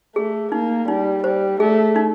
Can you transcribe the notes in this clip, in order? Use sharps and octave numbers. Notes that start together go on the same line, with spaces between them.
A3 G#4
A#3 D#4
G3 D#4
G3 C5
A3 G#4
D#4